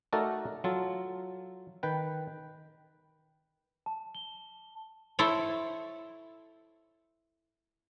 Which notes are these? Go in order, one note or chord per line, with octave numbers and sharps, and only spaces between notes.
A3 D#4 F#4 A4 A#4 D5
F#3 F4 A4
D#3 B4 G5
A5
G7
E4 A4 C5 C#5